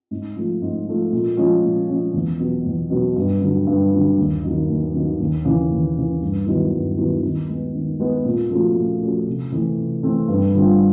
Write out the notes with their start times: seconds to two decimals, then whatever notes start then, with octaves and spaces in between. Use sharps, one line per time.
0.11 G#2
0.36 F3 A3
0.62 G#2
0.86 F3 A3
1.12 A#2
1.37 F3 G#3 C#4
1.63 A#2
1.88 F3 G#3 C#4
2.14 E2
2.39 B2 F#3 B3
2.66 E2
2.90 B2 F#3 B3
3.16 G2
3.41 D3 F#3
3.67 G2
3.92 D3 F#3
4.18 D#2
4.43 D#3 F#3 A#3 D#4
4.69 D#2
4.94 D#3 F#3 A#3 D#4
5.19 D#2
5.45 C#3 E3
5.70 D#2
5.96 C#3 E3
6.21 G2
6.46 D#3 F#3 B3 E4
6.73 G2
6.98 D#3 F#3 B3 E4
7.23 D#3
7.49 G#3 B3
7.75 D#3
8.00 G#3 B3
8.24 A#2
8.50 F3 A3 C#4 F#4
8.76 A#2
9.01 F3 A3 C#4 F#4
9.27 C3
9.52 E3 A3 C4
9.77 C3
10.03 E3 A3 C4
10.28 G2
10.54 D3 G3 C4 F4